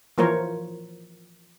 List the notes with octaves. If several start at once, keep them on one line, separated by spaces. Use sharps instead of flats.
E3 F3 A#3 A#4 C5 C#5